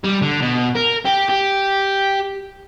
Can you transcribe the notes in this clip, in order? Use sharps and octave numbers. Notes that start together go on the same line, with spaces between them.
G3
D3
B2
A#4
G4
G4